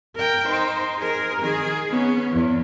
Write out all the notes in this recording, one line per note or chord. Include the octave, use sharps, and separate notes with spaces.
A#4 G5
D#4 C5
G#4 A#4
D#3 G#4
B3 C#4
E2